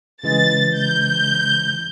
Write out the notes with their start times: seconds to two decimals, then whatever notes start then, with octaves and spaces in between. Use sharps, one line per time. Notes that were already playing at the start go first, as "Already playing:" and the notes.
0.23 C#3 E3 G#3 A6
0.76 G6